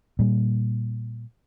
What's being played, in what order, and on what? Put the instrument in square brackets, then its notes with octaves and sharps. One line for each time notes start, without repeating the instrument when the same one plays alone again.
[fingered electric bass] A#2 G3